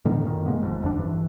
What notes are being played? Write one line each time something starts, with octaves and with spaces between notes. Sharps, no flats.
A2 D3 D#3 B3
F#2 A#2 D#3
C3 G#3 A#3 B3
G1 F2 G#2
F#1 F2 D3 D4
A#1 G2 E3